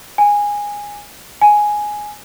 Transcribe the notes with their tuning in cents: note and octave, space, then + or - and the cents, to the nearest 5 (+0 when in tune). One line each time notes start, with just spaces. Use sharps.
G#5 -15
G#5 +5